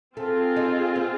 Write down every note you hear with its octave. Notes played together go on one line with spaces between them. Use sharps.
A3 C4 F4 G#4
D#4
B3